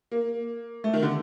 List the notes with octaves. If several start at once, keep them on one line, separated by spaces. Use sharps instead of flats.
A#3
A3
D#3
D3